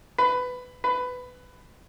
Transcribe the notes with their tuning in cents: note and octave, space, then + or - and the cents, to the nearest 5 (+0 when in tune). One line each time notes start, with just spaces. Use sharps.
B4 +15
B4 +15